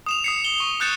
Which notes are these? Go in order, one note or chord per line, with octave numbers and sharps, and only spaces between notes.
D#6 E7 F7
D#6 C7 C#7
G7
C#6
D#6 F#6 G6 A6 C#7 E7